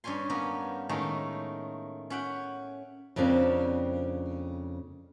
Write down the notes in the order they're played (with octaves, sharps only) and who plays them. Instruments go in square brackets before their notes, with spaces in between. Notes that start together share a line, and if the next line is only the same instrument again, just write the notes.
[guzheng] G2 C#4 C#5 G#5 C6
A#3 B3 C#4 D#4 A#4
A2 D#3 G#3 A3 C#4 D#4
C#4 E5 F#5 G5
[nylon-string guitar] F2 C#3 A#3 C4 D4